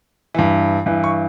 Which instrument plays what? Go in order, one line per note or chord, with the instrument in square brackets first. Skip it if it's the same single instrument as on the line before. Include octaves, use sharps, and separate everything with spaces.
[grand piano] G2 E3
G2 E3
C#6